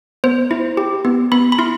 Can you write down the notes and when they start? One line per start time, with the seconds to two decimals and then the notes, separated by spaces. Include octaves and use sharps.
0.24 B3 C5
0.51 E4
0.77 G4
1.05 B3
1.32 B3 B5
1.52 B5
1.59 E4 C6